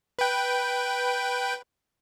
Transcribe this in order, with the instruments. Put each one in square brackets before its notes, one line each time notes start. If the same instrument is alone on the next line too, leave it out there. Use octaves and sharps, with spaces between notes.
[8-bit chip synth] B4 G5